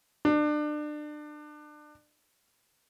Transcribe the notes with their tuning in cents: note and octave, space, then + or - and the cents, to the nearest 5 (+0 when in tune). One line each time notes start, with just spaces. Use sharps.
D4 +30